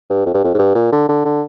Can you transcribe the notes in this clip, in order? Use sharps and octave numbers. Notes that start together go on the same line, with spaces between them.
G2
F2
G2
F2
G#2
G2
A#2
D3
D3
D3